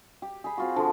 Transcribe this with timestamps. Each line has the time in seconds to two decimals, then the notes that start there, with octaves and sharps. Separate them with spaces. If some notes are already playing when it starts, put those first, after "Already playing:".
0.22 G4
0.44 G#4 B5
0.58 C4 F4 F#4
0.76 D3 F3